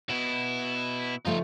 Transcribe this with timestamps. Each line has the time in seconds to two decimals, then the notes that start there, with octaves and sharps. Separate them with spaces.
0.10 B2 B3 E4
1.25 C#3 F3 A3 D#4 F4